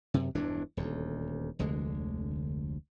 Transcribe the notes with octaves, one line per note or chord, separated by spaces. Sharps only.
F#2 C3
E1 G2 E3 D4
D#1 D2
F1 D2 D3 G#3